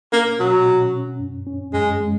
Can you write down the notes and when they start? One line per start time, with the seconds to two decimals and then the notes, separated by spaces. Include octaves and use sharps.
0.13 A#3 C#4
0.40 B2 F#3
0.67 C#4
0.94 C#4
1.20 F#2
1.47 C#4
1.74 F#2 G#3
2.01 G#3